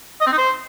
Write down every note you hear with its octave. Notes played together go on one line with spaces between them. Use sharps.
D#5
C4
D#4
C5